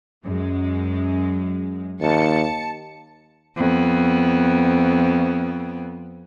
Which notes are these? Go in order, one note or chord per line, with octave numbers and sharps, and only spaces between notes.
F#2 G#3
D#2 A5 C#7
F2 B3